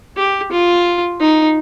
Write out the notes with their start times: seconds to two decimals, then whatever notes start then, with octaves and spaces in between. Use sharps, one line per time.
0.17 G4
0.52 F4
1.20 D#4